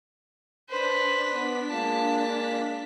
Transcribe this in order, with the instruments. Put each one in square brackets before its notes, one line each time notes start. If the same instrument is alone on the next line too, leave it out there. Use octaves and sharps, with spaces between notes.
[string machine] D4 B6 [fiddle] B4 C5
[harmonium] B3
[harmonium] G#3 A#3 F4 [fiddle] A5